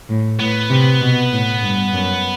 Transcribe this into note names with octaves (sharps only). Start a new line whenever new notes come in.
A2
A2 B3
C3
B2
A2
G2
F#2